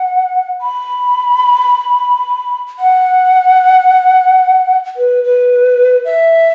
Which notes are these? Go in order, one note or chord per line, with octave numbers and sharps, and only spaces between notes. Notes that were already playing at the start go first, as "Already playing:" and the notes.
Already playing: F#5
B5
F#5
B4
B4
E5